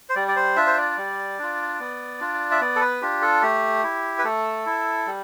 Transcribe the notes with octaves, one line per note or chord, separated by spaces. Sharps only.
C5
G3 D5
D5
C5
D4 F4 E5
C5
D5
G3
D4 F4
B3
D4 F4
E5
B3 D5
A4
B4
D4 F4 G4
A4
A3 G4
E4
B4
A3 A4
E4
G3